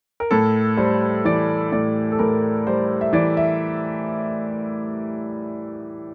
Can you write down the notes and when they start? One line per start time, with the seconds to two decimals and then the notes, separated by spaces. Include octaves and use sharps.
0.20 A#4
0.31 A2 A4
0.77 G3 C5
1.25 E3 D5
1.72 A2 D5
2.12 A4
2.19 A2 A#4
2.67 G3 C5
3.01 E5
3.13 E3 D5
3.37 E5